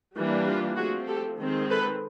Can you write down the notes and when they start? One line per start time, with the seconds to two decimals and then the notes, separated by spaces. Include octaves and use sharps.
0.15 E3 G3 A#3 D4
0.46 F4 G4
0.77 F3 A3 C4 F#4 G#4
1.08 G4 A4
1.39 D#3 G#3 C4
1.69 A4 B4